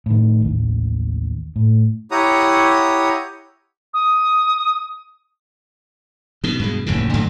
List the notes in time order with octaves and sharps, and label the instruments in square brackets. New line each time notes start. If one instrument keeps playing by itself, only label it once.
[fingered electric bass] A2 D#3
A1 D#2
A2
[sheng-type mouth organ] E4 G4 C#5 F#5 A#5 D#6
[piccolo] D#6
[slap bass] B2 D#3
G2 B2 G#3
F1 D#2 A2 C#3
G2 D3 F#3 A3